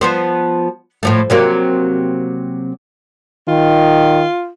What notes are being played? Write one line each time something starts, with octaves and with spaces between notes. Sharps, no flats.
F3 B3 C5
A2 F3 A3
C3 F#3 A#3
D#3 F4